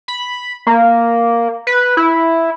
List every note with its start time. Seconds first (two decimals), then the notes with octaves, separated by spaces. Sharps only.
0.08 B5
0.67 A#3
1.67 B4
1.97 E4